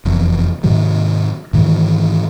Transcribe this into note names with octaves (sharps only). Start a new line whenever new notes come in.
F1 E2
G#2 C3 D#3 F#3
G#2 D#3 E3 F#3